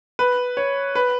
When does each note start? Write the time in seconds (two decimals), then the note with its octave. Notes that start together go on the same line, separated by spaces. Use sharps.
0.19 B4
0.57 C#5
0.95 B4